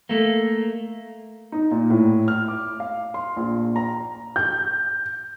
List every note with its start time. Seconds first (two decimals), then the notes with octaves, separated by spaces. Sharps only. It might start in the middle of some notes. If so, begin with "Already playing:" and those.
0.09 A3 A#3
1.52 D#4
1.71 A#2
1.90 A2
2.28 F6
2.48 D6
2.80 F5
3.14 C6
3.36 A#1
3.76 A#5
4.36 G6